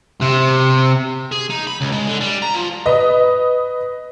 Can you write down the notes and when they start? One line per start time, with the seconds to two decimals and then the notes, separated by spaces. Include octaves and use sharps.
0.22 C3
1.32 G#4
1.50 D#4
1.67 B5
1.81 C#2
1.92 G#3
2.07 D3
2.21 G3
2.42 A#5
2.54 F3
2.86 B4 D#5 D#6